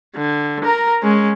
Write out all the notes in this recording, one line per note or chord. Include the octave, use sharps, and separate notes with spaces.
D3
A#4 A#5
G#3 C#4